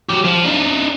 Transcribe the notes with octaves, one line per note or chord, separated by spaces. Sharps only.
F#3 G4
F3
D4 D#4